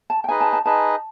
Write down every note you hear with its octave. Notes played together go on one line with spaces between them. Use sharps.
A5
G5
D#4 G#4 B4 D#5 G#5
A5
A5
D#4 G#4 B4 D#5 A5